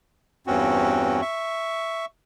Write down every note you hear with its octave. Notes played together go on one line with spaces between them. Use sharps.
E2 G2 C4 C#4 F#4
E5 C#6